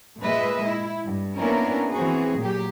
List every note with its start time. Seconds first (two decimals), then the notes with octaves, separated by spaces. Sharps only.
0.21 A#2 G#3 B4 D#5 E5
0.65 E4
1.05 G2
1.40 A#3 B3 C#4 D4 E4 A#4
1.92 E3 C4 F#4 G#4
2.39 A#2 F#3 G4